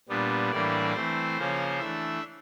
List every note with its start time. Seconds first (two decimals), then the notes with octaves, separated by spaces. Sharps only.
0.09 A#2 G3 B3 D4
0.51 A2 E3 G3 A#3 D4 D5
0.94 E3 A3 C4 C5
1.37 C#3 F3 A#3 C#4
1.79 E3 A3 D4 E5